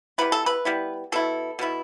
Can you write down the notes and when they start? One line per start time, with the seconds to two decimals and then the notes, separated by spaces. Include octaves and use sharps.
0.18 G3 B3 E4 B4
0.32 A4
0.46 B4
0.65 G3 B3 E4
1.12 B2 B3 E4 A4
1.59 B2 B3 E4